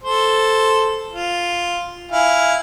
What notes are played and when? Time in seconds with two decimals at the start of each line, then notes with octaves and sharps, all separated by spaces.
0.04 A4 C5
1.13 F4
2.12 E4 F5 G#5